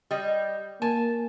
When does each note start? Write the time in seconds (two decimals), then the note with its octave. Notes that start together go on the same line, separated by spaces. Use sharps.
0.11 G3 D#5
0.82 A#3 G#5 A5